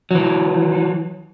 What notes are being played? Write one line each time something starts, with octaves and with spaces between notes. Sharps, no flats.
E3 F#3